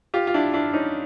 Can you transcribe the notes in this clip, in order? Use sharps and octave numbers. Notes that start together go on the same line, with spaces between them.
F4 G4
F4
D4 E4
D4 E4
C#4 D#4